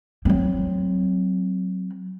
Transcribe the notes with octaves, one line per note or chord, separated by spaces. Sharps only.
F#3 C4